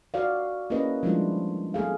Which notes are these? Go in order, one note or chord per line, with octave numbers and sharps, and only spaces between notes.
F#4 D5 F5
A#3 C#4 E4 G#4 B4 D#5
F3 G3 G#3 D4 E4 F4
A3 B3 G#4 F5